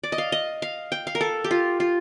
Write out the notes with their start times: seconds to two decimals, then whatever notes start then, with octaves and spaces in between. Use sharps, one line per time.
0.04 D5
0.12 D#5
0.18 F5
0.32 D#5
0.62 F5
0.92 G5
1.07 F5
1.15 A#4
1.21 A4
1.44 G4
1.51 F4
1.80 F4